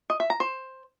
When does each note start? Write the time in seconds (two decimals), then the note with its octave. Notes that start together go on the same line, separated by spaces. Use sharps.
0.10 D#5
0.20 E5
0.30 A#5
0.40 C5